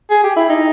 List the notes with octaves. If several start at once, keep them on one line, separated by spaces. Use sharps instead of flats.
G#4
G4
E4
D#4